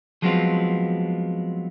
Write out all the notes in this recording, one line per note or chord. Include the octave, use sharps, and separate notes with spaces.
F3 F#3 G#3 B3 C4 F4